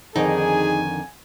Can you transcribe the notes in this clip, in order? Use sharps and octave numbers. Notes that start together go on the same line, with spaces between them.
F2 D3 D#3 D#4 G#4 G#5